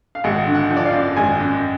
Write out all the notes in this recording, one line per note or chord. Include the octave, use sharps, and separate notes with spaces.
F5
G#1 F#5
D3
F#5
F3
D5
F5
F#2
G#1 G#5
F#2